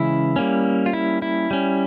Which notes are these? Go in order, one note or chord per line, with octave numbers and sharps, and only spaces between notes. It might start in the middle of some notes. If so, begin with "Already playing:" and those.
Already playing: C#3 E3 G#3 C#4 E4
G3 A#3 C#4
F4
E4
E4
G3 C#4